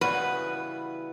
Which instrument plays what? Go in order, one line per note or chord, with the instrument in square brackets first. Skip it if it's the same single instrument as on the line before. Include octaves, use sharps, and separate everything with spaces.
[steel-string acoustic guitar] C#3 E3 G3 B3 F#4 [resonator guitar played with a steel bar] B4